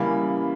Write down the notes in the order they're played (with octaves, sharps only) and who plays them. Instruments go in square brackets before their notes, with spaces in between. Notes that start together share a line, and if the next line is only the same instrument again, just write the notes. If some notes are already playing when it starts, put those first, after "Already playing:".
Already playing: [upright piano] C#3 E3 G3 A#3 B5